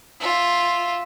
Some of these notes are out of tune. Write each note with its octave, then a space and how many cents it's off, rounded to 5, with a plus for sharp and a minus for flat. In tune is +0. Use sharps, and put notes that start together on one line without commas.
F4 +0 E5 +0